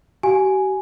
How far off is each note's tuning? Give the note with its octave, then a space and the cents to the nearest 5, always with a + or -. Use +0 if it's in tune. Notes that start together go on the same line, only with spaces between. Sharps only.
G4 -45 F5 +30 G#5 +0